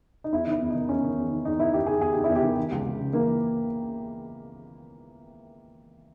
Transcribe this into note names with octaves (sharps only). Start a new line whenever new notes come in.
D#4
E2 E4
D#3
E4
E2
D#3 D#4
E2 C#4
D#3
E2
D#3
E2 D#4
D#3 E4
E2 G4
D#3 G#4
E2 G#4
D#3 G4
E4
E2
G4
D#3
E3
C#2
C#2
C#3
E3 A#3